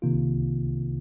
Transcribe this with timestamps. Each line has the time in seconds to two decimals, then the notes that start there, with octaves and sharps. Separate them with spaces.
0.02 C3 D#3 A#3 F4